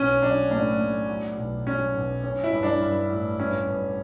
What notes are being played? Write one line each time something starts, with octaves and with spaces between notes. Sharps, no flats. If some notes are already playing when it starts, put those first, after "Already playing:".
Already playing: B1 C#4
F#3 D4
A2 D4
A2
F#3
B1
F#3 C#4
B1
C#4
E4
G2
D4
G2
A1
G2 C#4
G2